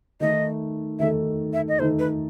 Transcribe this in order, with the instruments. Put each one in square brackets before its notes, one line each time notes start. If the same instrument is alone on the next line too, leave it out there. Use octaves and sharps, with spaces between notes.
[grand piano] D#3 A3 D#4 A4 [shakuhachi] D#5
[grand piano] D#3 A3 D#4 A4 [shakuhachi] E5
[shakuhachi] E5
D#5
[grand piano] D#3 A3 D#4 A4 [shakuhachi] C5
[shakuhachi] B4